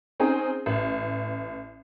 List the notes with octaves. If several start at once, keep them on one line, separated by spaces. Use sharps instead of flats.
C4 C#4 D#4 G#4
A1